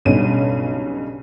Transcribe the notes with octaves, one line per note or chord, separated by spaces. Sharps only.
B1 G2 C#3 C#4 D#7